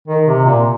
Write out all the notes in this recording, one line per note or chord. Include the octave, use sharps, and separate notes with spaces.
D#3
C3
A#2